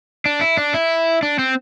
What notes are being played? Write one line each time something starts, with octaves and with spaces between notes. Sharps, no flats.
D4
E4
D4
E4
D4
C4